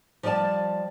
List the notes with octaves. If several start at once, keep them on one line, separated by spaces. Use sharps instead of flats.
F3 G3 D5 G5 A5